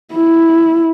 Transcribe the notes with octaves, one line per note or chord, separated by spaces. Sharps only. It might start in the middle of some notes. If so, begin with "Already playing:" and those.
E4